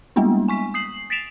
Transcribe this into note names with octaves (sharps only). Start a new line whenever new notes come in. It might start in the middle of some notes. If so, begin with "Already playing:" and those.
G3 G#3 A#3 B3 D4 E4
G#5 C#6 B6
D#6 C7 F#7
A6 B6 C7 D7 E7 F7